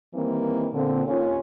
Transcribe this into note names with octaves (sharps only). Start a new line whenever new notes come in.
D#3 E3 G3 A#3 C4
A#2 D3 C4
D#2 C#4 F4